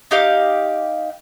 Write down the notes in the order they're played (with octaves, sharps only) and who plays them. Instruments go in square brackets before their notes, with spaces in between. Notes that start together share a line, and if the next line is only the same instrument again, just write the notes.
[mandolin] D#4 G4 F5